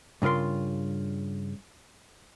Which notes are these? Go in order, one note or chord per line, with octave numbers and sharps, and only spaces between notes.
G2 C#3 F4 A#4 C6